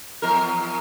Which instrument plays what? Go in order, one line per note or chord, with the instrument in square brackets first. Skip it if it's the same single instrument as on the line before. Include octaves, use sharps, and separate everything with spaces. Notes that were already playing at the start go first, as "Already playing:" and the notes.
[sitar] E2 A#4